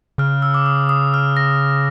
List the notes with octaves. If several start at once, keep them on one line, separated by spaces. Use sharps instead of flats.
C#3 F6
E6
D6
D#6
D#6
F6
A#6